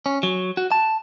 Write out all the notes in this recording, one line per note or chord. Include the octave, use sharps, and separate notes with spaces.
C#4
F#3
F#4
A5